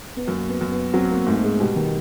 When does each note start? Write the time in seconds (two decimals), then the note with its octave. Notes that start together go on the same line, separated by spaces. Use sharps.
0.16 B3
0.27 F#2 A#3
0.49 B3
0.61 F#2
0.72 B3
0.94 F#3 C4
1.10 A#3
1.26 G#2 A3
1.44 G#3
1.60 B2 G3
1.76 D#3